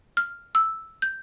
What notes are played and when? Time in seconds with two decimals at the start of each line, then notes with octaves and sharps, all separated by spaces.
0.17 F6
0.55 E6
1.02 G6